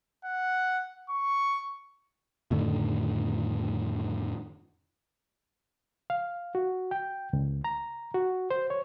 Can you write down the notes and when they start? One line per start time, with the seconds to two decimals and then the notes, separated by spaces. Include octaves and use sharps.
0.25 F#5
1.10 C#6
2.51 F2 A2 D3 D#3
6.10 F5
6.55 F#4
6.91 G5
7.33 C#2
7.64 A#5
8.14 F#4
8.51 C5
8.70 C#5